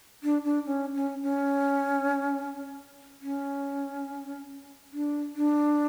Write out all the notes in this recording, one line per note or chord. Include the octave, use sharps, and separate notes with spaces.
D4
D4
C#4
C#4
C#4
C#4
D4
D4